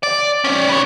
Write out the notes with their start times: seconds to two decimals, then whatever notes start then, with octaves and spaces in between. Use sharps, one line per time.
0.03 D5
0.44 C#4 D5
0.69 B3 C#5